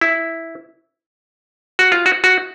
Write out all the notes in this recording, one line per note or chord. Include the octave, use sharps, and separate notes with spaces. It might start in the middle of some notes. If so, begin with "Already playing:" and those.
E4
F#4
F4
F#4
F#4